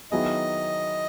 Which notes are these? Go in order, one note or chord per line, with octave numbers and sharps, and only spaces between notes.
D#3 F#3 B3 E4 G#4 D#5